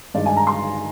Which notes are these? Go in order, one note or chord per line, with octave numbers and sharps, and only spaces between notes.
G2 D#3 G#3 D5
G#5
A#5
C6